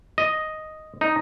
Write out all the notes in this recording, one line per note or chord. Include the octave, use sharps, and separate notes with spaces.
D#5
D#4